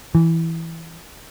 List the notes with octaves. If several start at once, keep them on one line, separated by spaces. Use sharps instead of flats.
E3